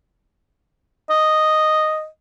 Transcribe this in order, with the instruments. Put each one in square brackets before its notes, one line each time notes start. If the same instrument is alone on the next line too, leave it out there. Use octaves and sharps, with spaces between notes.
[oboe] D#5